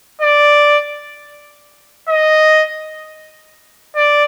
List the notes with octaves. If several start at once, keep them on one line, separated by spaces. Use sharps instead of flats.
D5
D#5
D5